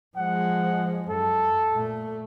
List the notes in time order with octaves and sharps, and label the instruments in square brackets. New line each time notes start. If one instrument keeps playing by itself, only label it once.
[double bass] F3 G#3 [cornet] F#5
[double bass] F#2 [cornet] A4
[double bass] A#2 A3